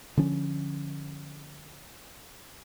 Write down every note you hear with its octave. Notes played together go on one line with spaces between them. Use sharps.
D3 F3 C#4